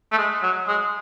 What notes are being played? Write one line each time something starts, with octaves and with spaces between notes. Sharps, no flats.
A3
G#3
F#3
G#3